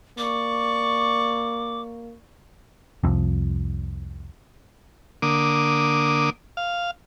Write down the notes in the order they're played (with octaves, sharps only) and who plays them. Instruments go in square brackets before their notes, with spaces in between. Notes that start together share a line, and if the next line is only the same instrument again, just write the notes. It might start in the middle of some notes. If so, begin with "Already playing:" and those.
[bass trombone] A#3 [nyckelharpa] D5 C#6 [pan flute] D6
[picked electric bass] C2 F2
[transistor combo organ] D3 A#3 D6 D#6
F5